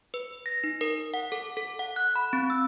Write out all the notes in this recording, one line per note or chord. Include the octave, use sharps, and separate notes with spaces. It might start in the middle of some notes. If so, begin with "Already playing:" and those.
B4
A#6
D#4
A#4
F#5
A4
A4
F#5
F#6
B5
C4
E6